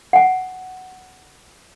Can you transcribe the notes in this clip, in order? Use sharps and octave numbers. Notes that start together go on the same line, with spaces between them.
F#5 G#5